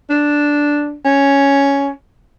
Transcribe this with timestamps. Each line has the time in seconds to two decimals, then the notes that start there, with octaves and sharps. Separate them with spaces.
0.10 D4
1.05 C#4